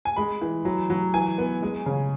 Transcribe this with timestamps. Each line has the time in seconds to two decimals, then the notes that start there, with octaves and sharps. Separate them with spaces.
0.05 G#5
0.16 G#3 B5
0.41 E3
0.65 F#3
0.90 F#3
1.14 E3 G#5
1.38 B3
1.62 G#3
1.86 C#3